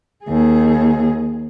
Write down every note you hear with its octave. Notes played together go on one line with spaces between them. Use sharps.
D#2 G#4